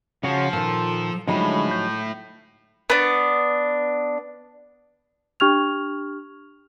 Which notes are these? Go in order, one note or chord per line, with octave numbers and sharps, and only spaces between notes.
C#3 F3 F#4 C#5
A#2 D#3 A4
A2 D3 F3 F#3 G#3 D#4 B5
G6
B3 D4
D4 G4 C#6 F6 G#6 F7